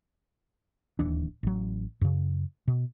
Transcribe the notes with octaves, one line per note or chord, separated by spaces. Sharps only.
D1 D#2 E3 D4
A1 F#3
F#2 C#3
B2